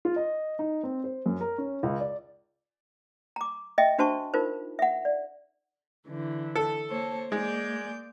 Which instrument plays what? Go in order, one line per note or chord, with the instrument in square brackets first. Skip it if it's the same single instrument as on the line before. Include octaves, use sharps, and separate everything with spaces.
[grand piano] F4
D#5
D#4
C4
C5
F#2
A#4
C#4
C#2
D5
[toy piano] A#5 D6
D#5 E5 G5
D4 F#4 C5 A5 C#6
D#4 F4 A#4 C5
E5 F#5
D5
[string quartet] D3 E3
[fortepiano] A4
[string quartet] A#3 C5 C#5
[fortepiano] G#3 [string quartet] A#3 D5 G6